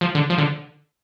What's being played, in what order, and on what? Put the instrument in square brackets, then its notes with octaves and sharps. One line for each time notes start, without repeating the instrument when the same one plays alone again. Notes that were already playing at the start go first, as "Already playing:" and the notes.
[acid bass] F3
D3
F3
D3